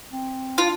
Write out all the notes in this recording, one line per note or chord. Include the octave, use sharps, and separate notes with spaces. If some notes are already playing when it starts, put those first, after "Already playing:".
C4
D4 F4